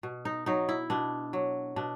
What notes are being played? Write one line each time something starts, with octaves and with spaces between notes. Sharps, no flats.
B2
D#4
F#3 D#4
E4
B2 D4
F#3
B2 D4